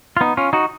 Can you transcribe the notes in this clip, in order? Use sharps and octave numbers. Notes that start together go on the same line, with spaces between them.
F4
B3 D#4
C#4 F4
D#4 F#4